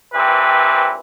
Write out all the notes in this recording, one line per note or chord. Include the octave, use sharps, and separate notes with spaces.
A#1 E3 C4 G4 B4